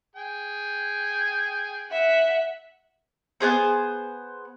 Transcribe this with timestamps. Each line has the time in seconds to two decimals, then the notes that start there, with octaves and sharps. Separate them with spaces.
0.16 G#4 G5
1.91 E5 F#5
3.40 B3 D4 G#4 C5